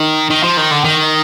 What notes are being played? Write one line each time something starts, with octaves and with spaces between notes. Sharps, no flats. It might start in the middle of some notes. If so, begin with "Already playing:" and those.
Already playing: D#3
D#3
F3
D#3
D3
D#3